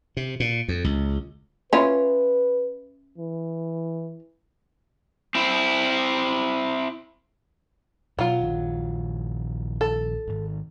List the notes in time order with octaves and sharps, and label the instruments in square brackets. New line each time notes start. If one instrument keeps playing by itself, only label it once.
[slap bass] C3
A#2
F2
C#2
[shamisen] C#4 E4 F4 [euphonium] B4
[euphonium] E3
[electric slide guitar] C4 E4
[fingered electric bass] B2 [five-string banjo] F#3 F4
[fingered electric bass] A#1 D#3
[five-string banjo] A4
[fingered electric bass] G#1 D#3